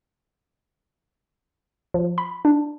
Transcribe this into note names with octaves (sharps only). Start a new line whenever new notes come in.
F3
B5
D4